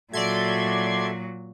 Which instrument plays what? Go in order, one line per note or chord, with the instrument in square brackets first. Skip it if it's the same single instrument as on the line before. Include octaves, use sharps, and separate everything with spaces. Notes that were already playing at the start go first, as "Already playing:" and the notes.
[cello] A#2 F#3 [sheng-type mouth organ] F#4 A4 E5 [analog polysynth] D5 C6 G#6